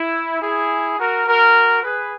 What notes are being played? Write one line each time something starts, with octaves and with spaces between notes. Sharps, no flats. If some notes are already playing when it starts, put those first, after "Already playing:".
Already playing: E4
E4 G#4
F#4 A#4
F#4 A#4
G#4 B4